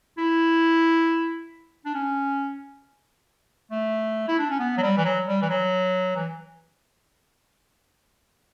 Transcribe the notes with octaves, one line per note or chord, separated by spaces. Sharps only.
E4
D4
C#4
A3
E4
D4
C#4
B3
F#3
G3
E3
F#3
G3
E3
F#3
E3